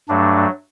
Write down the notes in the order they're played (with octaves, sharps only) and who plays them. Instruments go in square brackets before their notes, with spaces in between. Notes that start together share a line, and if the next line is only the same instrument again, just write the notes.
[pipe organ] G2 F#3 A3 D4